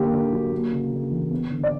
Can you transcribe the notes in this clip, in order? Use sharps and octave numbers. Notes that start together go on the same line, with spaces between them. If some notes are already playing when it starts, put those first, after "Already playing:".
Already playing: D3 A#3 G4
D3
F#3
A#3
C#3
C#3
E3
B3
D3
D5